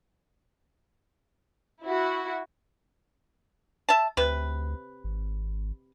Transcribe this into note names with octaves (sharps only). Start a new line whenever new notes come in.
E4 F#4
E5 A5
D2 C3 B4
G#1